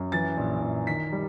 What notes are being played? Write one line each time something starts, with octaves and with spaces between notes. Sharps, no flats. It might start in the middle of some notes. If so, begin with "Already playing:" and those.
Already playing: F#2
E3 A6
A#1
A#1
D#3 B6
G3